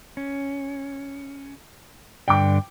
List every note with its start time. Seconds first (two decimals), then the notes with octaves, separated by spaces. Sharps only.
0.17 C#4
2.28 G2 D3 D5 G5 D6